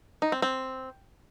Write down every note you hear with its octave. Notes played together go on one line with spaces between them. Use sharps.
D#4
C4
C4